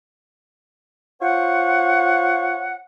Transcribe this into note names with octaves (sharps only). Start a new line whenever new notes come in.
F4 C5 C#5 F#5